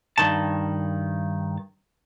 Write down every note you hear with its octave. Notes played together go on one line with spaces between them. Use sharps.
G2 D#3 A5